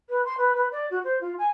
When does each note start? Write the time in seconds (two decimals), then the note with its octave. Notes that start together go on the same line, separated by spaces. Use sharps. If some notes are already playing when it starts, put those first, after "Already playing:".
0.09 B4
0.25 C6
0.38 B4
0.55 B4
0.72 D5
0.91 F#4
1.04 C5
1.21 F4
1.38 G#5